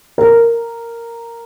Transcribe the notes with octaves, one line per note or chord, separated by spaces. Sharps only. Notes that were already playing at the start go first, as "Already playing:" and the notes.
A#4